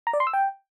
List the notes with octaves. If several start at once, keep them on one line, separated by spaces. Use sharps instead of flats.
A#5
D5
C6
E6
G5